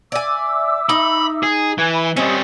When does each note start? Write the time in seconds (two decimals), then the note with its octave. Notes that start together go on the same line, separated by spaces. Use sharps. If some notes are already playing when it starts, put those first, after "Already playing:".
0.12 D5 E5 G#5 D6 E6
0.89 D#4 B5
1.43 G#4
1.78 E3 G#5 F#6 G#6
1.92 E5 G#5 B5
2.17 G3 C4 C#4 G4 D#5 D#6